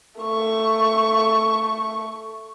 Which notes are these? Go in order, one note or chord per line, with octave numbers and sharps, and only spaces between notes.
A3 C#6